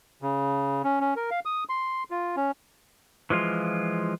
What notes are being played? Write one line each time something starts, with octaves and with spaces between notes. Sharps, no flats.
C#3
C#4
C#4
A#4
F5
D#6
C6
F4
C#4
E3 F3 G#3 F4